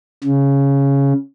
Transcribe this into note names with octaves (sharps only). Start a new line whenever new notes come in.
C#3